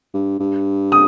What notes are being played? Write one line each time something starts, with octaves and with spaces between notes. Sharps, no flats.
G2
G2
D#6